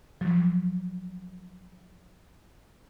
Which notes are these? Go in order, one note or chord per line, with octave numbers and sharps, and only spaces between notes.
F3 F#3